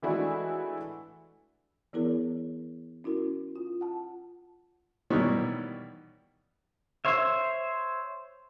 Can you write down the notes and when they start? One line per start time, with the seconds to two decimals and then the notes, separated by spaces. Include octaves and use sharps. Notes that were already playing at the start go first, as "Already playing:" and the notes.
0.02 E3 G#3 A3 D4 E4 F#4
1.93 E3 B3 E4 G#4 A#4 C#5
3.04 C#4 E4 F#4 A#4
3.56 F4
3.81 F#5 A5
5.10 B2 D#3 E3 G3 C#5 C#6
7.05 C5 C#5 E5